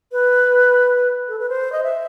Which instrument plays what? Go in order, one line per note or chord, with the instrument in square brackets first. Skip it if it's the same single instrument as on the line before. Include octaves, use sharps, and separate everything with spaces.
[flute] B4
A4
B4
C5
D#5
E5